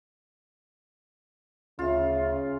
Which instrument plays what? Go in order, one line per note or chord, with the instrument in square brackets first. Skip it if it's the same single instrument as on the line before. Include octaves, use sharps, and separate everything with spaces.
[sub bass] D2 [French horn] C#3 [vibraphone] C#4 E5 [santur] F4